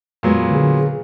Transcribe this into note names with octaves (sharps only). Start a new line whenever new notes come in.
F2 A#2 F#3 G#3 B3
D3 G#4